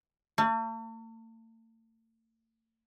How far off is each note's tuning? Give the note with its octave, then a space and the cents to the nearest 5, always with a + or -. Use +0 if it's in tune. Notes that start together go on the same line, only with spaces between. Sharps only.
A3 +45